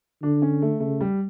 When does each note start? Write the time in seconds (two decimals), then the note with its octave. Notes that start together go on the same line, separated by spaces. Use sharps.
0.23 D3 D4
0.42 C#4
0.62 A3
0.80 C#3 A3
1.01 G3